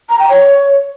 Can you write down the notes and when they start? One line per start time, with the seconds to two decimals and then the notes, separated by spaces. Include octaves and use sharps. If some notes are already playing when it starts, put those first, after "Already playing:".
0.09 A#5
0.19 G5
0.29 C#5